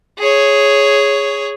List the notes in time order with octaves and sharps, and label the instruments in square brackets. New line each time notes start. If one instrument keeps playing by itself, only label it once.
[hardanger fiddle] G#4 C#5